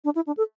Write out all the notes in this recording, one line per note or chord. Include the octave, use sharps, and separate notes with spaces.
D4
E4
D4
A4